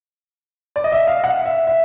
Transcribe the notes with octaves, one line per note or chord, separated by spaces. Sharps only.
D5
D#5
E5
F5
F#5
E5
E5